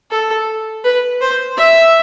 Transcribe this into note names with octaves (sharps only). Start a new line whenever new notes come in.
A4
B4
C5
E5